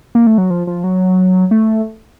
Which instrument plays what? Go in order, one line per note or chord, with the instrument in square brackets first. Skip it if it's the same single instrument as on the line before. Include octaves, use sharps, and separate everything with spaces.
[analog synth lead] A#3
A3
F#3
F3
F3
F#3
A3